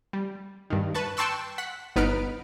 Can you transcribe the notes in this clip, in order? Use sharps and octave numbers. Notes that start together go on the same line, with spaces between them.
G3
G2 D#3
B4 A5 C#6
G5 A5 C6 C#6 E6 F#6
F#5 B6
G1 B3 D#4 B4 F6 D7